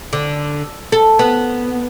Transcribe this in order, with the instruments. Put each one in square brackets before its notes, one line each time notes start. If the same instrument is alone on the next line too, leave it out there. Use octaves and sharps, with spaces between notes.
[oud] D3
A4
B3